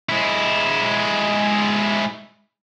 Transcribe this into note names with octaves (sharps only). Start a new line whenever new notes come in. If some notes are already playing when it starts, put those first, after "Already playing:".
G#3 E4